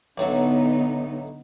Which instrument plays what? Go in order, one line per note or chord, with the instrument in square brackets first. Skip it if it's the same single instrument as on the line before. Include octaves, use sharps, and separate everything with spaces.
[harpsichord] B1 A2 F#3 [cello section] D3 B3 D#4